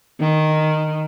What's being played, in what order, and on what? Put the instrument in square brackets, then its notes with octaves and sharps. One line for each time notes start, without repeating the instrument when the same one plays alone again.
[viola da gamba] D#3